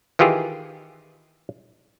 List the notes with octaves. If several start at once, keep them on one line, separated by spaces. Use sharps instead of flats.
D#3 E3 F4 G4 G#4